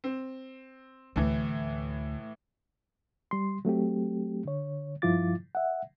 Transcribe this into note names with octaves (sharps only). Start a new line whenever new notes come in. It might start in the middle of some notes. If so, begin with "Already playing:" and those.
C4
D2 A2 E3
G3 C6
F#3 A3 C4 G4
D3 C#5
G2 F3 E4 F4 D6 A6
E5 F#5